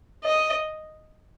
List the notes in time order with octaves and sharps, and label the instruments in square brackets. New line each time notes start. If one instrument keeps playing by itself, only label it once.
[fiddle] D#5